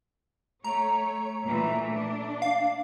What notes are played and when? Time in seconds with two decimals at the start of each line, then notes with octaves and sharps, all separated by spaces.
0.64 A3 C#5 A#5
1.45 A#2 E3 A3
1.93 D4
2.42 F5